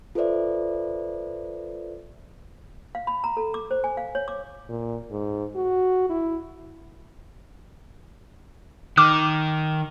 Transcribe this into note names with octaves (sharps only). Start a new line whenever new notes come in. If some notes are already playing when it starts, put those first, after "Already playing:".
F4 A4 B4 C5 D5 E5
F5
B5
A#5
A4
D6
C5
G#5
F5
C#5
D6
A#2
G#2
F#4
E4
D#3 D6 F6